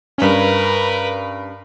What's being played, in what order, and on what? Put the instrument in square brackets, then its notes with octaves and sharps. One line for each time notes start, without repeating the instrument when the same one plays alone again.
[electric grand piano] G2 C#4 [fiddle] A#4 B4